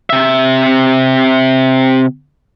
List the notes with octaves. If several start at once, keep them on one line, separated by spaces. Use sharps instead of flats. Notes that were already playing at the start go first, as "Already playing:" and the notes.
C3 E5